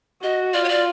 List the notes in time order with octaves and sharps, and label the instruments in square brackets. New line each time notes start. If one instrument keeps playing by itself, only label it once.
[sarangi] F#4 [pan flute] D#5
[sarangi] F4 [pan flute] D5
[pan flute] C#5
D5